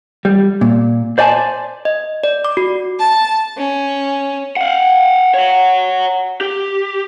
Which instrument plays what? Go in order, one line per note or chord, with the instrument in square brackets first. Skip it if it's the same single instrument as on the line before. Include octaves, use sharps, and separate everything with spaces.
[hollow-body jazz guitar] G3
A#2
C5 D5 D#5 G#5 A5
[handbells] D#5
D5
D6
F#4
[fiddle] A5
C#4
[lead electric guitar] F5 F#5
C#5 F#5
G4